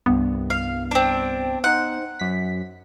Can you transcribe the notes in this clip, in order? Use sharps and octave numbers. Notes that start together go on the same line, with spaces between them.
C2 G2 B3
F5
C4 D4
D#4 C5 F#5
F#2 B6